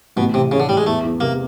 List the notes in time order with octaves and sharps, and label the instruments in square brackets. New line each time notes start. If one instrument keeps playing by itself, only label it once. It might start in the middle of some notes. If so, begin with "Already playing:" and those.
[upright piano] A1 [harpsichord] B2
[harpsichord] C3 [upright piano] E3
[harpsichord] C#3 [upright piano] E3
[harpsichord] D3
[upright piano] A1 [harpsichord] G3
[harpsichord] G#3
[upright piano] E2 [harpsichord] A3
[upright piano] E2
[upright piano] C3 [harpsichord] A#3